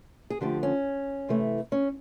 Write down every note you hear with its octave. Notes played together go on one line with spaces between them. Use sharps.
G#4
D3 F3 A3 G4
C#4
C3 E3 A3
C#4